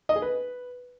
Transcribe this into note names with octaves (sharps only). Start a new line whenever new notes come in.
D#5
G#4
B4